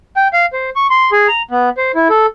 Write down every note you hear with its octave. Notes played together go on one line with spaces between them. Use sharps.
G5
F5
C5
C#6
C6
G#4
A#5
B3
C5
E4
A4